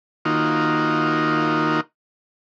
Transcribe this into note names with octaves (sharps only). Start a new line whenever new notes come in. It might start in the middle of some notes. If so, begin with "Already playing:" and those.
D#3 A#3 D#4 F4 F#4